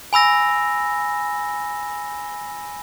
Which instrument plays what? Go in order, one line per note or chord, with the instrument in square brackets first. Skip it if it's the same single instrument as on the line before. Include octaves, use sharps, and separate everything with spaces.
[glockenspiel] G#5 B5 E6 A#6